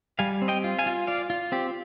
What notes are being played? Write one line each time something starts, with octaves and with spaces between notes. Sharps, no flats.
G3 F5 G#5
C4
D#5 G5
F4
F5 G#5
F4
F4 D5 F5
F4
C4 G4